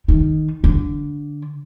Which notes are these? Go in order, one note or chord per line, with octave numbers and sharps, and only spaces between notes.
D#3
D3